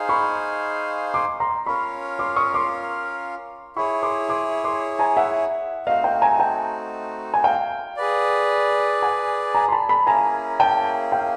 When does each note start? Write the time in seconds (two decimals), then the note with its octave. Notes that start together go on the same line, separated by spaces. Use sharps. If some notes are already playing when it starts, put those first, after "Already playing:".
Already playing: D#4 G#4 C5 F5 G#5
0.09 B5 C#6
1.14 C6 D6
1.40 A#5 C6
1.66 C#4 F4 A#4 C#5 F5 B5 C#6
2.19 C6 D6
2.36 C#6 D#6
2.54 C6 D6
3.76 E4 G#4 C#5 B5 C#6
4.03 C6 D6
4.29 C6 D6
4.64 C6 D6
4.99 G#5 A#5
5.17 E5 F#5
5.86 A3 C4 D#4 F#4 D#5 F5
6.04 F5 G5
6.22 G#5 A#5
6.39 G5 A5
7.34 G#5
7.44 F5 G5
7.97 G#4 B4 D5
9.02 F#5 G#5
9.55 G#5 A#5
9.68 C6
9.72 A5 B5
9.89 A5 B5
10.07 A#3 C#4 E4 G#4 G#5 A#5
10.60 G5 A5
11.12 F5 G5